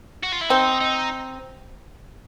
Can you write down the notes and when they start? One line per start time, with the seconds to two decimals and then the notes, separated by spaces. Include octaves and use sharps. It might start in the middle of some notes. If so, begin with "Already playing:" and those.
0.24 F#4
0.33 F4
0.41 E4
0.50 C4 D#4
0.81 D#4